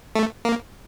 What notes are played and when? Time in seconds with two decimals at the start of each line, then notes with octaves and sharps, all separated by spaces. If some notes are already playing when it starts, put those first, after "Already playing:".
0.15 A3
0.45 A#3